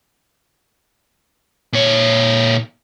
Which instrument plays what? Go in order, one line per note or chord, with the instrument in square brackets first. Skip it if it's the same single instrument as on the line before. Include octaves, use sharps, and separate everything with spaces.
[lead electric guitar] A#2 C#5